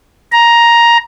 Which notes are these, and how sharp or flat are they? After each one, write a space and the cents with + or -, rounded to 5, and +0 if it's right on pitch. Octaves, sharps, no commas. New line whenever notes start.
A#5 +10